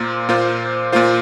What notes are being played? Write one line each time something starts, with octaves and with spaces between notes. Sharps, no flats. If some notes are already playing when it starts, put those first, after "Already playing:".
Already playing: A#2 A#3 F4 C5
A#2 A#3 F4 C5
A#2 A#3 F4 C5